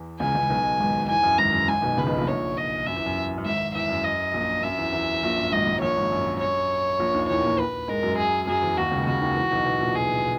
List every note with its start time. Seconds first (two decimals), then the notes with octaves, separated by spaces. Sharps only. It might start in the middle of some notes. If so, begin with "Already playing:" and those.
Already playing: E2 E3
0.20 C#2 C#3 G#5
0.35 C#2 C#3
0.49 B1 B2
0.80 G#1 G#2
1.08 E2 G#5
1.23 F#2
1.38 G#1 G#2 A#5
1.53 F#2
1.67 G#1 G#2 G#5
1.82 B1 B2
1.97 C#2 C#3 B4
2.07 B1 B2
2.17 A#1 A#2
2.27 C#5
2.57 D#5
2.86 F#2 E5
2.96 E2
3.06 F#2
3.38 F#2
3.45 G#1 G#2 E5
3.75 E2 E5
3.89 F#2
4.04 D#5
4.34 A#1 A#2
4.63 F#2 E5
4.78 E2
4.93 E2
5.23 A#1 A#2
5.37 F#2
5.52 G#1 G#2 D#5
5.67 G#1 G#2
5.81 A#1 A#2 C#5
5.97 G#1 G#2
6.12 F#2
6.40 C#5
6.99 A#1 A#2
7.14 D#2 D#3
7.29 E2 E3 C#5
7.44 A#2 A#3
7.59 B4
7.88 G#2 G#3 A#4
8.03 F#2 F#3
8.18 G#4
8.47 F#2 F#3 G#4
8.62 E2 E3
8.77 D#2 D#3 F#4
8.92 C#2 C#3
9.06 C#2 C#3 F#4
9.21 D#2 D#3
9.36 E2 E3
9.52 B1 B2
9.65 B1 B2
9.80 A#1 A#2
9.95 G#4